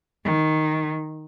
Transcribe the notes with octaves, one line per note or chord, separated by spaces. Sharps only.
D#3